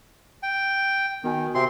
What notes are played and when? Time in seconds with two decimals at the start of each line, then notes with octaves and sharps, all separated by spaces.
0.43 G5
1.24 D#3 B3 F#4 G#5
1.55 C3 C4 F#4 E5 G5 C6